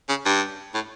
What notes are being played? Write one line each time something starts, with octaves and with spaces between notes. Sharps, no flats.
C#3
G2
A2